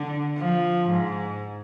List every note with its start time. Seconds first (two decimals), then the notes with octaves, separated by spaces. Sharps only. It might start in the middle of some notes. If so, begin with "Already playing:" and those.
Already playing: D3
0.38 F3
0.89 G#2